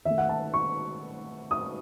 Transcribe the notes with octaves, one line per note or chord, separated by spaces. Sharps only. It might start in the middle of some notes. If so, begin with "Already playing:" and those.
D#3 A3 E5
F#5
A5
C#6
D#6